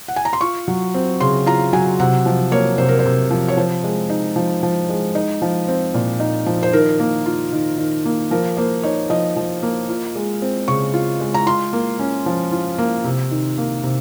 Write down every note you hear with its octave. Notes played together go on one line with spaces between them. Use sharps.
F#5
G#5
A#5
C6
F4 C#6
F#3
C4
C#3 C6
F4 A#5
F#3 G#5
C3 F#5
F3
A#3 C#5
C3 C5
A#4
C5
C3
F3
C#5
F3 C5
G#3
D#4
F3
F3
G#3
D#4
F3
C4
A#2
D#4
F3
C5
D#3 A#4
A#3
F4
D#3
D#3
A#3
F3 A#4
A#3 C5
D#4 C#5
F3 D#5
F3
A#3
F4
G#3
C4
C#3 C#6
F4
G#3
A#5
F4 C6
A#3
C#4
F3
F4
A#3
C3
D#3
A#3
C3